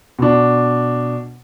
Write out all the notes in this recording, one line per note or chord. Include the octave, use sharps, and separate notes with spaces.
B2 D4